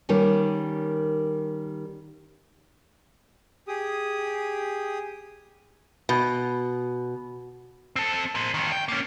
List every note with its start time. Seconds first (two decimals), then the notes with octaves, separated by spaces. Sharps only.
0.09 D#3 G3 A#3 C#4
3.68 G4 G#4 D#6
6.09 B2
7.96 C4 A4
8.35 A#4 C5
8.54 F2 D#3
8.72 G5
8.88 A#3 C#4